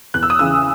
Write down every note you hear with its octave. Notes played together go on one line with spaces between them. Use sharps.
E2 F#6
E6
D#6
C#3 E3 E6